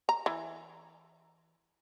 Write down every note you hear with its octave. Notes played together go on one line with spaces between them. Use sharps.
A#5
E3